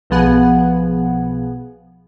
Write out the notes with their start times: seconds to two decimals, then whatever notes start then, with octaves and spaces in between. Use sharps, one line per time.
0.10 B1 B2 F3 B3 G#4 F#5